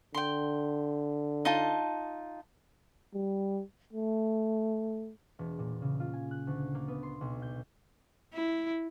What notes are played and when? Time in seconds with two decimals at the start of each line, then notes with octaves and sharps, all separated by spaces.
0.14 D3 G5 C6
1.45 D#4 F4 A5
3.14 G3
3.93 A3
5.39 E1
5.59 A#2
5.82 C#3
6.00 F4
6.13 G#5
6.31 F#6
6.47 D2
6.75 A#3
6.88 B3
7.03 C6
7.21 B1
7.42 G6
8.34 E4